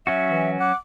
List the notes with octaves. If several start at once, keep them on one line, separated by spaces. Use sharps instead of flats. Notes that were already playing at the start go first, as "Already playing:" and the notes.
F#3 C#4 F#4 E5
E3
F#5 D6